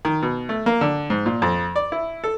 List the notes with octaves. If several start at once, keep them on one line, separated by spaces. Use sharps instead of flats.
D#3
B2
A3
A#3
D3
G#2
A#2
F2
D5
E4
A4